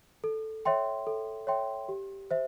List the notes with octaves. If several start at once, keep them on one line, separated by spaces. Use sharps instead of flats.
A4
C#5 E5 G5 C6
A4
C#5 E5 G5 C6
G4
C5 E5